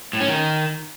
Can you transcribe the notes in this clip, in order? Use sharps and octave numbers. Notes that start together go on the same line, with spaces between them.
A2
C#4
D#3